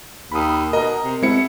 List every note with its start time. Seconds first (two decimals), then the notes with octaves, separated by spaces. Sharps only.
0.32 D#2 B5 D#6
0.73 B2 A#4 D#5 A#5
1.04 C3
1.23 B2 G#3 C4 E4 C#7